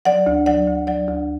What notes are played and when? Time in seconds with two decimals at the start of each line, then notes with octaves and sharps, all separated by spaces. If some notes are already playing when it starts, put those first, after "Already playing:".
0.05 F#3 D5 F#5
0.26 D2
0.46 F#3 D5 F#5
0.67 D2
0.87 F#3 D5 F#5
1.08 D2